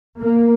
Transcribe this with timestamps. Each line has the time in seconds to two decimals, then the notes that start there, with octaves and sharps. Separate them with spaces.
0.20 A#3